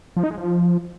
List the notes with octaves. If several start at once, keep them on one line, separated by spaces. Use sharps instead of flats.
F3
D#4
G#3
F3